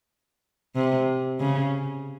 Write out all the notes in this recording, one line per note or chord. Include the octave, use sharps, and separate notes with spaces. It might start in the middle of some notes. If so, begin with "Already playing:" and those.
C3
C#3